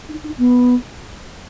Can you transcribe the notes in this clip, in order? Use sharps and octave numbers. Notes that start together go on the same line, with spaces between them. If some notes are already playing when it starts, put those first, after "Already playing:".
D#4
D#4
B3